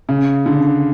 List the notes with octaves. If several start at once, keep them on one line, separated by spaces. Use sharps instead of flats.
C#3
D3